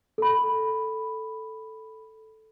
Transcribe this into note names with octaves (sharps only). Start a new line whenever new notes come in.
A4 B5